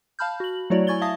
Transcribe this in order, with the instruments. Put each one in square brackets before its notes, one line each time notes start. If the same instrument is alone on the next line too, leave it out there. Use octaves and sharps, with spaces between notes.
[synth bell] F5 A5 B5 F6 G6
F#4 F#7
F#3 A3 E4 F#4 C#5 D5
E4 G#5 C#6 G#6 A6 G7
E5 F5 A5 D#6 A#6